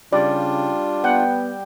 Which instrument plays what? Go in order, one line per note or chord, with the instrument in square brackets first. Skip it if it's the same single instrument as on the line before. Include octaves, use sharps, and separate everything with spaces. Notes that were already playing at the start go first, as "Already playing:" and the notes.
[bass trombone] C#3 [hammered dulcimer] G3 [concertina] D4 F4 [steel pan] D5
[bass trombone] B3 [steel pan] F#5 [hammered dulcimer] G5